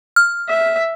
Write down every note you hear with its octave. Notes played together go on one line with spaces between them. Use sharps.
F6
E5